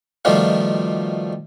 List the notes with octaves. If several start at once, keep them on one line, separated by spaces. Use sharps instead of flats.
B2 D#3 F3 G3 A3 F4